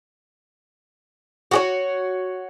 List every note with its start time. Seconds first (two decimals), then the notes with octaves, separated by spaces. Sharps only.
1.51 F#4 G4 C#5